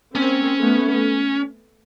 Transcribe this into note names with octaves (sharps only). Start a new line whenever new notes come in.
A#3 C4 C#4
A3 B3